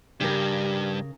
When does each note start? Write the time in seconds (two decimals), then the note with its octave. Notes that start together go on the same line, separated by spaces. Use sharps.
0.20 G2 C#3 G4 A#4